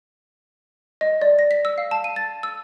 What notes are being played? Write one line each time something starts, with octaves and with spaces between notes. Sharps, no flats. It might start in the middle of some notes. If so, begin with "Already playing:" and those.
D#5
D5
A#6
B6
E6
F5
A5
D#7
A6
E6